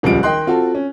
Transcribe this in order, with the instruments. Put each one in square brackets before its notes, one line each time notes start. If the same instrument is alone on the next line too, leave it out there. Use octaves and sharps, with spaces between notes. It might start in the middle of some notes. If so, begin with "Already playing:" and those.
[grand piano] D#1 C#2 F3 G3 D7
D#3 D#5 G5 C6 F#6
C4 F4 F#4 A4
C#4